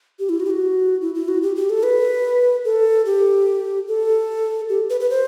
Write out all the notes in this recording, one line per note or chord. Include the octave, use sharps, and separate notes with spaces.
G4
E4
F#4
G4
F#4
E4
E4
F#4
G4
G4
A4
B4
A4
G4
A4
G4
B4
B4
C5